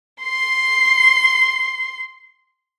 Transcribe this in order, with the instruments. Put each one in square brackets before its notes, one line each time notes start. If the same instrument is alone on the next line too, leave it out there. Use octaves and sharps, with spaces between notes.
[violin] C6 C7